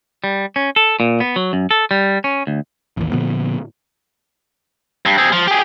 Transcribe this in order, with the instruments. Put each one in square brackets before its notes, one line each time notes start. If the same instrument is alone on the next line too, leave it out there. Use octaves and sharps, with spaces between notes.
[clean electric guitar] G3
C#4
A4
A#2
B3
F#3
F#2
A4
G3
C#4
D2
[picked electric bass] A1 D#2
A#2 D3 F3 B3
[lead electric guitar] G2
C4 G#4
F3
G4 G#4